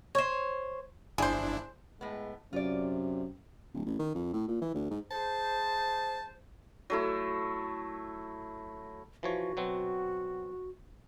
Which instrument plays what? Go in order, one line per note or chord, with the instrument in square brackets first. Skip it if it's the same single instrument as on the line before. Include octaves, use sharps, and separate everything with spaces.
[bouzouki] C5 C#5
[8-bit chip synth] G1 D4 E4 [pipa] G#4 C5
[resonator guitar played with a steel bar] A2 B3 [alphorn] G#3
[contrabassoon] F#2 [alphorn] C3 [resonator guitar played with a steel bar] F4 D5
[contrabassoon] D1
A1
D#3
F2
A2
A#2
E3
D2
G#2
[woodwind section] G#4 C5 [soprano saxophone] A5
[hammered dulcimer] F#3 A3 E4
[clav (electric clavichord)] E3 F3 C#5 [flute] F#4
[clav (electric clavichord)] B2 F#3 C4